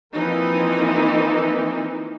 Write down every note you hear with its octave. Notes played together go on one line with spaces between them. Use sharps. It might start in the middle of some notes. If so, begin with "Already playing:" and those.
E3 F3 A#3 C4 D#4